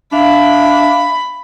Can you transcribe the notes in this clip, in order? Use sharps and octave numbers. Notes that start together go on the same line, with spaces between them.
D4 E5 F5 B5